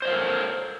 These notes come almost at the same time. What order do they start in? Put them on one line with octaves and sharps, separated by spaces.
C5 D#5 F5 A#4 A4